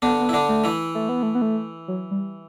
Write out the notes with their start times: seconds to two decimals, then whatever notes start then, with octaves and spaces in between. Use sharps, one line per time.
0.02 D3 B3 D4
0.21 B3
0.29 E4
0.33 D3 D4
0.49 A3
0.64 E3 E4
0.95 A3
1.09 B3
1.23 A3
1.35 B3
1.42 A3
1.88 F#3
2.11 G3